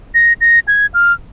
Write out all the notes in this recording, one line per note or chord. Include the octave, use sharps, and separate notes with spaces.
A#6
A#6
G#6
F6